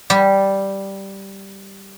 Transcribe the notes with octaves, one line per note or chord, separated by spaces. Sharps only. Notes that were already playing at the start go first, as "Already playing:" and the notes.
G3 G4